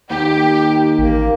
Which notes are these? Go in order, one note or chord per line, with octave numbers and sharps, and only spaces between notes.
D#2 G4
A1 A#3